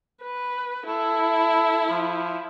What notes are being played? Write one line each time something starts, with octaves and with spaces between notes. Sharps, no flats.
B4
E4 A4
F3